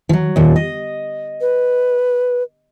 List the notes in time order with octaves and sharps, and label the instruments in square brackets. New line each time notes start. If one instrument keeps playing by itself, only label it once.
[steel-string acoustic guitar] F3 F#3
D#2 A#2
D#5
[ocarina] B4